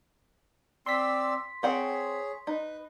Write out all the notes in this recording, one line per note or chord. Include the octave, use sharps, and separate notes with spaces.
C4 D5 C6 E6 B6
C4 G#4 C#5 F#5 G5
D#4 B4